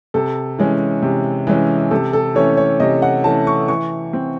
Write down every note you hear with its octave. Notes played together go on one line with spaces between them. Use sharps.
C3 A4
E3 G#3 C#4
C3
E3 G#3 C#4
C3 A4
A4
E3 A3 C#4 C#5
C#5
C3 D#5
F#5
E3 A3 C#4 A5
C#6
E3 C#6
C4